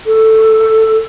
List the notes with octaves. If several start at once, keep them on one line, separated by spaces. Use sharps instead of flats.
A4